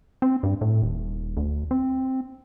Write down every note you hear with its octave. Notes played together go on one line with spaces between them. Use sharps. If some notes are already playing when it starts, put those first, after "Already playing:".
C4
G2
A2
D#1
D2
C4